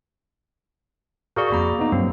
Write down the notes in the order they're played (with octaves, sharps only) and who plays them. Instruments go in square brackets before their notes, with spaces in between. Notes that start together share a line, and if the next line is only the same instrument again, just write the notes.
[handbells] F#4 G#4 D5 [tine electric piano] A#4 F5 C#6
[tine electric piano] F2 B5 [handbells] A#3 A#5 D6
[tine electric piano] B3 D#4
[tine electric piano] G2 F#3 C4 [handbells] A#3